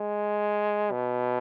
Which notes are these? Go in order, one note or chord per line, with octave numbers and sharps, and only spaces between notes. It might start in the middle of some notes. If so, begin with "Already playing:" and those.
Already playing: G#3
B2